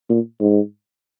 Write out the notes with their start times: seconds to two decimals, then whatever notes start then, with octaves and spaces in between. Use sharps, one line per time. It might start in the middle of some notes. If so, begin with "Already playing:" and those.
0.09 A#2
0.41 G#2